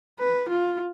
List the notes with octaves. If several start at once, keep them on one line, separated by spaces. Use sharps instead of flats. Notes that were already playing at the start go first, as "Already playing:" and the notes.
B4
F4